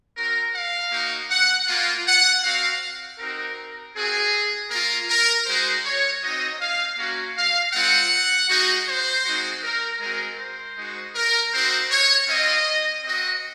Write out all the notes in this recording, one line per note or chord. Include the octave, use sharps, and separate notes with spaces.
C4 F#4 A#4
F5
A#3 D#4 F#4
F#5
A#3 F4
F#5
C4 F#4 F5
C4 D#4 F#4 A#4
C4 F#4 G#4
A#3 F4 A#4
A#4
G#3 D#4 F#4 C5
C#5
C4 D#4 F#4 D#5
F5
A#3 C#4 F#4
F5
G#3 C4 F4 F#5
G#3 D#4 F#4
C5
G#3 C4 D#4 F#4
A#4
G#3 C4 F#4 A#4
C5
G#3 D#4 F#4
A#4
C4 D#4 F#4 C5
C#5
C4 F4 D#5
C4 F#4 D#5